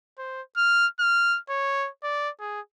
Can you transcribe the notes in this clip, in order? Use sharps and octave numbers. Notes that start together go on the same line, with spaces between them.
C5
F6
F6
C#5
D5
G#4